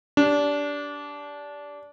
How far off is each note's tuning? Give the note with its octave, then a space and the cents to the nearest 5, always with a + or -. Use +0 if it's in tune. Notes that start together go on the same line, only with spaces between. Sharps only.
D4 -20 G4 +0